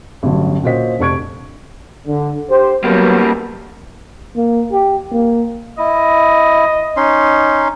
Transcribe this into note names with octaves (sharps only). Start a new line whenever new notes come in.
A1 G2 D3 F#3
A#2 C#4 F#4 C5 D#5 B6
F1 D4 C#6 G#6 D7
D3
G4 C5
F#3 G3 A#3 B3
A#3
G4
A#3
E4 D#5
C#4 D#4 C6